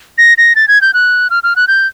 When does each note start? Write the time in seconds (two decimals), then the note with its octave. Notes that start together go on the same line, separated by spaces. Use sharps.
0.18 A#6
0.38 A#6
0.56 A6
0.68 G#6
0.81 G6
0.94 F#6
1.30 F6
1.43 F6
1.56 F#6
1.68 G6